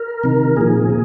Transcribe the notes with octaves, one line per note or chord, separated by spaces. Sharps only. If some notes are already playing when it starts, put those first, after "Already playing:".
Already playing: A#4
C3 D#3
A#2 F3 G#4
A#2